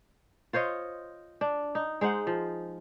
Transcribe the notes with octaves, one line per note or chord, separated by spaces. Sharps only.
F4 C5 C#5 D#5
D4
D#4
G#3 D#4 C5 F#5
F3